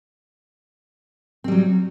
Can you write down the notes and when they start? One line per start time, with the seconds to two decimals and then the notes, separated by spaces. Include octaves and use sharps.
1.44 C4
1.48 G3
1.52 F#3